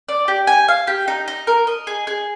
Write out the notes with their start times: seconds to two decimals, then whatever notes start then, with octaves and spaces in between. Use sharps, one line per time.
0.09 D5
0.28 G4
0.47 G#5
0.68 F5
0.87 G4
1.08 D#4
1.28 D#4
1.47 A#4
1.67 D#5
1.87 G#4
2.07 G#4